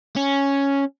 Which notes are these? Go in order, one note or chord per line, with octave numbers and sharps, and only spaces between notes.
C#4